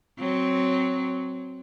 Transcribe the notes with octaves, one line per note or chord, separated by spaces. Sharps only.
F#3 C4